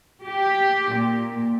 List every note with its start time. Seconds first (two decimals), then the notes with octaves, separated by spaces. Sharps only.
0.25 G4
0.93 A#2